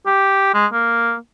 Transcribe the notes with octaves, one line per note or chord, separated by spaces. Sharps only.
G4
G#3
A#3